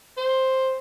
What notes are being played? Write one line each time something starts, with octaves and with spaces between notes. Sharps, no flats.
C5